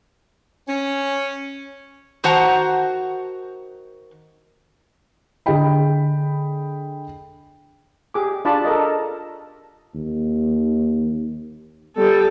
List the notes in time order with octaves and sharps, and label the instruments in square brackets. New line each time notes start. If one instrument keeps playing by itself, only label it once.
[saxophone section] C#4
[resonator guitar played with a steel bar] D#3 F#4 C5 F#5 A5 A#5
[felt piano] D3 G#4 D#5 G5 B5
[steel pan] G4 G#4 D6
D4 F4 D5 A5 B5 C#6
A4 A#4 D#5
[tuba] D#2
[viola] G3 A4 [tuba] B3